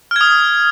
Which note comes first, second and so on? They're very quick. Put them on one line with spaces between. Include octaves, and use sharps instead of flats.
F6 G#6 D#6